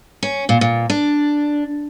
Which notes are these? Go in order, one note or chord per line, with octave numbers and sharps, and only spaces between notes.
C#4
A#2
A#2
D4